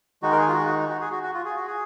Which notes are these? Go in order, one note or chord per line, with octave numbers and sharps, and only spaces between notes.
D#3 G#3 D#4 F#4
A#4
G#4
F4
F#4
F#4
F#4
G#4
F#4
F#4
F4
G#4
F#4
G#4